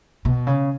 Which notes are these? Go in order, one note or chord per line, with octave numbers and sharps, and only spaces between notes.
B2
C#3